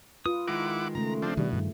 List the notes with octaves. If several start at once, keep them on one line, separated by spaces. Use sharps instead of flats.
F4 B4 D#6
D#3 G#3 E4 A#4 F#5 D6
C#3 A3 A#5
F3 C4 D4
B2 D#3 G3 D4
G2 D#3